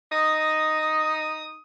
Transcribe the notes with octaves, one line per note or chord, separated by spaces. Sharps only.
D#4 D#6